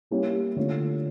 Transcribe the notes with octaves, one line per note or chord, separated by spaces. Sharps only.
G3 A#3 C#4 E4 G4
D3 A3 C#4 F4 C#5